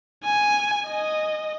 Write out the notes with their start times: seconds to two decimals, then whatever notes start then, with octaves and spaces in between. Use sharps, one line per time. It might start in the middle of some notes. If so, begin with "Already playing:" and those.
0.25 G#5
0.88 D#5